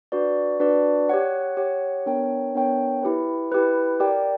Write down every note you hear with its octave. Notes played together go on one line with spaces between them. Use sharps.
D4 F#4 B4 D5
D4 F#4 B4 D5
G4 C#5 F#5
G4 C#5 F#5
B3 D4 A#4 C#5 G5
B3 D4 A#4 C#5 G5
E4 G4 B4
E4 G4 B4
G4 A#4 D5 G5